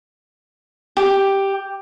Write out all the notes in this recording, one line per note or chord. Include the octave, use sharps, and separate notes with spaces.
G4